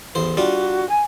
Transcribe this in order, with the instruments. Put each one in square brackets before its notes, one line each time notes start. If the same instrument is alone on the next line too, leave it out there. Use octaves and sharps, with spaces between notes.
[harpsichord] A1 E2 C5
[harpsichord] G3 D4 F4 [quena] F#4
[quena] G#5